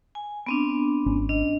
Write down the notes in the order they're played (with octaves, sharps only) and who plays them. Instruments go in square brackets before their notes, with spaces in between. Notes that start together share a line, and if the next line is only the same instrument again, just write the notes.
[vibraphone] G#5
B3 C4 D4
[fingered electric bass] G#1 C#4
[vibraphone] D4 D#5